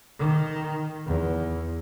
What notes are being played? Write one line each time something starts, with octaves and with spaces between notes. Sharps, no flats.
D#3
E2